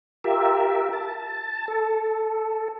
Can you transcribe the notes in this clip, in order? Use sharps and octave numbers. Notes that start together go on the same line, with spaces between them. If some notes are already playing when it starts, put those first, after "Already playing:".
F4 G4 A#4 E5
A5
A4